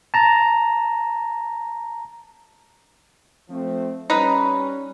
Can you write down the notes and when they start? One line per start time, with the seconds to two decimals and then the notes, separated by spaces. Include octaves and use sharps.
0.14 A5 A#5
3.50 F3 A3 C4
4.10 G3 C#4 D#4 B4